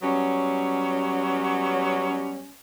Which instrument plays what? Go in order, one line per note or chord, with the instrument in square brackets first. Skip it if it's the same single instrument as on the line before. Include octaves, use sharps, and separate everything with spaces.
[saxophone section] F#3 G3 B3 C#4